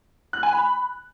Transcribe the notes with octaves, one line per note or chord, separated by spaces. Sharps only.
F#6
G#5
B5